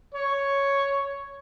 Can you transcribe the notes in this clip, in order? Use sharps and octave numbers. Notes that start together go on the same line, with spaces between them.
C#5